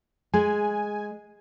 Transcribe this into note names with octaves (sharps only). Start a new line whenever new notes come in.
G#3 G#5